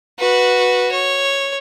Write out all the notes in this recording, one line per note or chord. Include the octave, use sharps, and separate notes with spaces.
F#4 B4
C#5